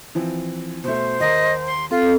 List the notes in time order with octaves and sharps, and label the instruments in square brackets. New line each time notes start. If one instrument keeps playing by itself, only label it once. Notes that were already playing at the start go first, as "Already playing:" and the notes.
[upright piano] E3 F3 C4
[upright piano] B2 A3 [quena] C5
[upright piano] D#2 A#4 [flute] D#5
[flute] C6
[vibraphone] C4 A4 [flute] F4